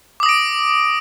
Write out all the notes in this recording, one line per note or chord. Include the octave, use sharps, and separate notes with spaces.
D6 D#6 A#6 D7